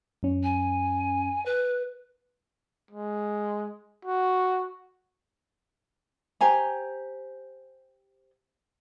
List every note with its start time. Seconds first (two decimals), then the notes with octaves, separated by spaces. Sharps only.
0.23 F#2 C#4
0.43 G#5
1.45 B4
2.91 G#3
4.05 F#4
6.41 G4 C5 G#5 A#5